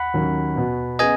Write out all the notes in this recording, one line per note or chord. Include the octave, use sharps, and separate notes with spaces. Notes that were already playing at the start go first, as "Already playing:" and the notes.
Already playing: F#5 B5
D#2 D#3 F#3 C#4
B2 B3 F#4
C#3 B3 G#4 B4 D#5 G#5